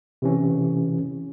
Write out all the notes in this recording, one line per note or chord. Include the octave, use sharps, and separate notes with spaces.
C3 E3 C#4